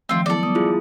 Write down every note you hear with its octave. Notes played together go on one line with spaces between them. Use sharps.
D#3 F3 A3 C4 F4
F#3 B3 E4 A4 D5
G3 B3 D#6
E4 F4 G#4